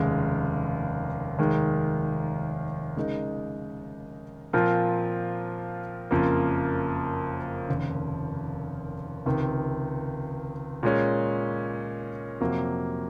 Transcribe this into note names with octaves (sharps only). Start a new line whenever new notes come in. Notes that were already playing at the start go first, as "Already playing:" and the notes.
Already playing: F1 D#2 C#3 G#3
F1 D#2 D#3 G#3
C#3 G#3 D#4 A#4 D#5
A#2 F3 C4 F4 A#4
F#1 F2 C#3 F3 A#3
F1 D#2 C#3
C#2 C3 D#3
A#2 G#3 C#4
F2 C3 F#3 A#3